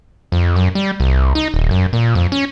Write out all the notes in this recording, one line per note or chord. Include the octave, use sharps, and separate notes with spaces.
F2
F#2
G3
C2
D#4
D#1
F#2
A#2
F2
C#4